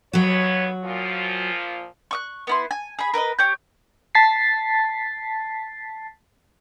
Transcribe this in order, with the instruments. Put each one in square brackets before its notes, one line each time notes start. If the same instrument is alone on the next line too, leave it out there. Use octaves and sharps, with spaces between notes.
[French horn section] D#2 B3 C#5 [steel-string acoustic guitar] F#3 F#4
[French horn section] A#2 F3 F4
[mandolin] C#6 D6 F#6
B3 E4 C6
G#5
G#4 B5
A#4 B4 D5 D#5
G4 C#5 G6
[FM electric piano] A5 A6 B6 C7